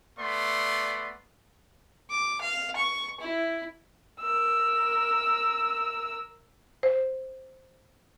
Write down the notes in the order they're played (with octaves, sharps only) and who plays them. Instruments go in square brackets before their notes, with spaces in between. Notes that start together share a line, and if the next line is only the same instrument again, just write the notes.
[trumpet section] A3 B3 D5 C6
[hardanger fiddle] D6
F5
C#6
E4
[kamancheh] A#4 E6
[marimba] C5